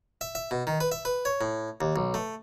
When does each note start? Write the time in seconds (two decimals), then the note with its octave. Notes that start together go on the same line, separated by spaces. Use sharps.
0.21 E5
0.35 E5
0.51 B2
0.67 D#3
0.81 B4
0.92 E5
1.05 B4
1.25 C#5
1.41 A2
1.81 D#2
1.96 B1
2.14 A3